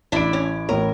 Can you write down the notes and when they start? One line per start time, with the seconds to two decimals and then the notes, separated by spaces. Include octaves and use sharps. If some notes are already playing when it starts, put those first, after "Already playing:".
0.12 A1 D4 E4 D7
0.33 C#4
0.69 A1 A2 A#4 C#5